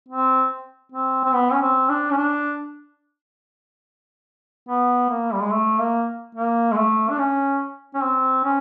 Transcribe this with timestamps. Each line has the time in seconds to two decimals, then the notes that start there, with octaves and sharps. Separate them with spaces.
0.08 C4
0.92 C4
1.24 C4
1.33 B3
1.52 C#4
1.62 C4
1.89 D4
2.11 C#4
2.17 D4
4.68 B3
5.10 A#3
5.33 G3
5.42 G#3
5.51 A3
5.79 A#3
6.35 A#3
6.72 G#3
6.77 A3
7.10 D4
7.19 C#4
7.94 C#4
8.03 C4
8.44 C#4